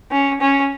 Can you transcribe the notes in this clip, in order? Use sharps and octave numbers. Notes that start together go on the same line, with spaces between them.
C#4
C#4